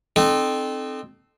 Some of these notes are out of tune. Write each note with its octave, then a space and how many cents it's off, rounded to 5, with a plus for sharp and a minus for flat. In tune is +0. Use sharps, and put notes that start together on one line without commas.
C4 +0 D#4 -35 A4 -15